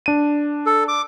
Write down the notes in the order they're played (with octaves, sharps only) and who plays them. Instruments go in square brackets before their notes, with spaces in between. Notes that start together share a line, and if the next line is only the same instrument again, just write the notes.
[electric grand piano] D4 D#7
[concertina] A4
D6